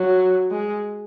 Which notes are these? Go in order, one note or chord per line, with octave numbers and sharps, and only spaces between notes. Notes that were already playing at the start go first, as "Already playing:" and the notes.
Already playing: F#3
G#3